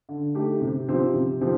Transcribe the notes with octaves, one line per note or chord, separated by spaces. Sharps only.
D3
A3 D#4 G4
C3
F3 C4 D#4 G4
C3
F3 C4 D#4 G4